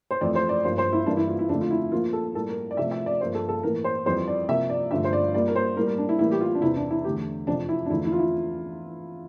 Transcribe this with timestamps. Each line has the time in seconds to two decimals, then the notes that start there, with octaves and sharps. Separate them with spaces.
0.11 C5
0.21 F2 E3 A3 D5
0.35 C5
0.49 D5
0.64 G2 F3 A#3 C5
0.78 C5
0.93 E4
1.06 G2 E3 G3 A#3 D4
1.17 E4
1.28 F4
1.39 E4
1.49 F2 D3 A3 D4
1.61 F4
1.71 E4
1.92 A#2 F3 A#3 F4
2.13 A4
2.34 A2 G3 A#3 A4
2.49 A#4
2.71 D5
2.77 C3 F3 A3 E5
2.91 E5
3.06 D5
3.20 G2 F3 A#3 C5
3.35 A4
3.49 A4
3.63 A2 E3 A#3 A#4
3.84 C5
4.06 F2 E3 G3 C5
4.28 D5
4.49 C3 F3 A#3 E5
4.70 D5
4.91 G2 D3 F3 A3 E5
5.04 C5
5.13 D5
5.34 A#2 G3 A#3 D5
5.48 A#4
5.56 C5
5.76 A2 G3 A#3 A#4
5.87 A#4
5.98 D4
6.09 E4
6.19 A2 E3 G3 A#3 E4
6.31 G4
6.41 F4
6.55 D4
6.62 E2 C3 E3 E4
6.77 D4
6.91 E4
7.04 E2 D3 A3 G4
7.47 F2 C3 F3 D4
7.69 E4
7.86 D4
7.90 E2 D3 F3 A3 E4
8.05 E4
8.12 F4
8.19 E4